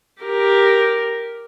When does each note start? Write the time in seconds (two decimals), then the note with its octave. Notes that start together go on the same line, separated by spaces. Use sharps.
0.22 G4 A#4